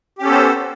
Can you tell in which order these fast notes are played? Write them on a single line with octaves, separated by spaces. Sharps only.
G4 C#4 A4 B3 C5